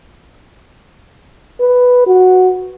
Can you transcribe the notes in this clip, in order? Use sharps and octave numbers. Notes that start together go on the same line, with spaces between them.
B4
F#4